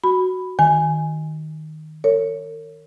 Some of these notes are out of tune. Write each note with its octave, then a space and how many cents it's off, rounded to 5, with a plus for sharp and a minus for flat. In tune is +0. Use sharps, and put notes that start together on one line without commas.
F#4 +0 B5 +0
D#3 +0 G#5 +0
A#4 -40 C#5 +0